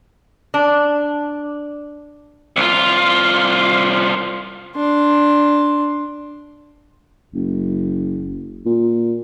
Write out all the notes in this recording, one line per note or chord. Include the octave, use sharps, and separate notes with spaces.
D4
C2 F4
D4 C6
F#1
A#2